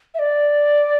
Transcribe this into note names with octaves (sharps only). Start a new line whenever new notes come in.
E5
D5